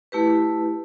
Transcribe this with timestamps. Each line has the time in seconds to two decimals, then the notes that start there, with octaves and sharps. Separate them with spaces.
0.12 A3 E4 G4 B4